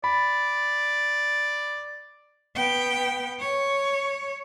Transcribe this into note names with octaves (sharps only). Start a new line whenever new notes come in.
D5 B5
B3 G5
C#5